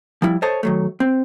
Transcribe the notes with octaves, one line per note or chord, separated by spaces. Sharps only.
F3 G3 E4
A4 C5 C#5 D#5 A5
D#3 F#3 A3
C4